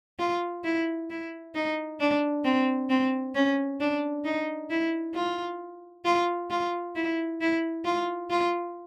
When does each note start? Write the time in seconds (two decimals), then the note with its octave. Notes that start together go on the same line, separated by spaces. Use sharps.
0.19 F4
0.64 E4
1.10 E4
1.55 D#4
2.00 D4
2.44 C4
2.90 C4
3.35 C#4
3.80 D4
4.25 D#4
4.70 E4
5.15 F4
6.05 F4
6.51 F4
6.95 E4
7.41 E4
7.85 F4
8.30 F4